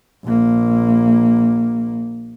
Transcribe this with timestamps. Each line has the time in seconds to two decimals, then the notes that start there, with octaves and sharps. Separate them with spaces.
0.25 A#1 A#3